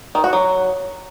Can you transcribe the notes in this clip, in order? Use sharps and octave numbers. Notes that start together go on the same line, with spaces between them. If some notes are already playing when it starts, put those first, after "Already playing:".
D#3
F#4
F#3